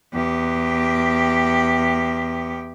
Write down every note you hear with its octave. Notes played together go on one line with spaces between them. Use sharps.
E2 G4